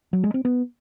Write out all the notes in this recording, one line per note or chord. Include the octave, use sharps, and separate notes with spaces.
F#3
G#3
C4
B3